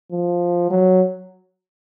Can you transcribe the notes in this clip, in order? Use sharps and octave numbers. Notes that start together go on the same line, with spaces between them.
F3
F#3